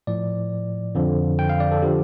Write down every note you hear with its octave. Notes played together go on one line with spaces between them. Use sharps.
A2 F3 D5
F2 D3 F3
G5
F5
D5
A4
D3 F3 G4